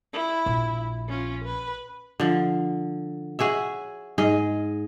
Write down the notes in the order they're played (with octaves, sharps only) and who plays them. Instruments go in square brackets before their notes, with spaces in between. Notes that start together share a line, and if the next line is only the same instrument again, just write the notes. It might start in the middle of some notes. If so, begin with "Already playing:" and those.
[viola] E4
[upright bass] A#1
[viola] C#4 F4
B4
[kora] D3 F3
F#4 G#4 C#5 E5
G#2 G#4 D#5